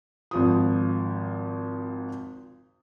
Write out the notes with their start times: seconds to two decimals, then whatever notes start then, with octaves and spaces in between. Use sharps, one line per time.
0.31 G#1 F3 D#6